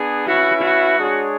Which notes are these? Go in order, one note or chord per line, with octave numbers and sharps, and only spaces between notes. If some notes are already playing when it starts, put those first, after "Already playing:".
Already playing: B3 D4 G#4
C#4 E4 F#4 B4 E5
F#4
G#3 D4 G#4 C#5